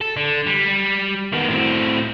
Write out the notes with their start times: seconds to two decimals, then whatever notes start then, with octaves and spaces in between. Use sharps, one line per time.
0.01 A4
0.17 D3
0.47 G3
1.33 D#3 B3
1.48 A2 C4